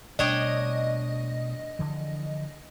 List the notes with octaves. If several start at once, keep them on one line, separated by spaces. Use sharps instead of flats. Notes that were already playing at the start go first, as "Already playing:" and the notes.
B2 G3 A3 D4 C#5 D#5 G5
D3 E3 F3